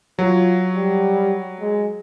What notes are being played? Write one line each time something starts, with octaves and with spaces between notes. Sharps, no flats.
F#3 F4
G3
G#3